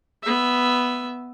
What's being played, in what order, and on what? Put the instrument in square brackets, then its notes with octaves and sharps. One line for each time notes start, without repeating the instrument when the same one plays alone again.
[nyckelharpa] B3 E5